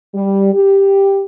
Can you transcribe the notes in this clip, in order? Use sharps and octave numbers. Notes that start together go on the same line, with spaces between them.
G3
G4